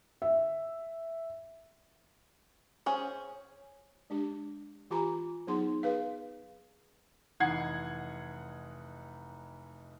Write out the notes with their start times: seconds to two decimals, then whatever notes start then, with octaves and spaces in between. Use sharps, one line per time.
0.22 E5
2.86 C#4 G#4 C5
4.10 G#3 D4 G4
4.90 E3 F4 G4 G#5 A#5 B5
5.47 F#3 B3 D#4 G#4 C6
5.83 G#4 B4 F5
7.40 F1 E3 D#4 F#5 G#6 C7